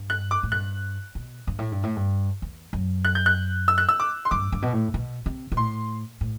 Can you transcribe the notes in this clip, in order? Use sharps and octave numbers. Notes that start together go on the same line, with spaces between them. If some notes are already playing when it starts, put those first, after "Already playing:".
Already playing: G2
F#6
D6
A2
G2 F#6
B2
G2
A2
G2
A2
G2
E2
F#2
F#6
G6
F#6
E6
F#6
E6
D6
C6
G2 D6
G2
B2
A2
B2
C3
B2
A2 C6
A2